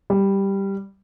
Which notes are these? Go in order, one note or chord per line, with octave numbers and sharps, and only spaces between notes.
G3